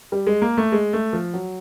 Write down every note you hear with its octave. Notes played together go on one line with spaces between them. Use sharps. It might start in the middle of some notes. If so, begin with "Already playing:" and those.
G3
G#3
A#3
A3
G#3
A3
F3
F#3